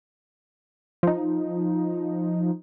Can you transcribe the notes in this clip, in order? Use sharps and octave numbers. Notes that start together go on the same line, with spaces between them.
F3 D#4